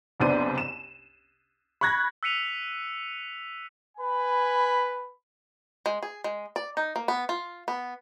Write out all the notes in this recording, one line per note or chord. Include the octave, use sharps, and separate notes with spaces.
F#1 C2 B3 D4 C5 D#7
E7
B5 C#6 F#6 G#6 A#6
E6 F#6 B6 C#7 D#7 F7
B4 G#5 B5
G#3
G#4
G#3
D5
D#4
A#3
B3
F4
B3